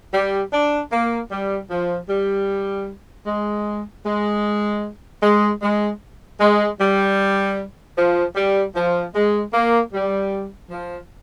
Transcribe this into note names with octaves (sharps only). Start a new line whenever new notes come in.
G3
D4
A#3
G3
F3
G3
G#3
G#3
G#3
G#3
G#3
G3
F3
G3
F3
G#3
A#3
G3
F3